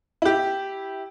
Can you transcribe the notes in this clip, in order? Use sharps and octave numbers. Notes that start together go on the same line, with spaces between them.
E4 G4